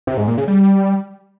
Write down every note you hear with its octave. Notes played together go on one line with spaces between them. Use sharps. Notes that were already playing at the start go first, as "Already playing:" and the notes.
C3
G#2
A#2
C#3
G3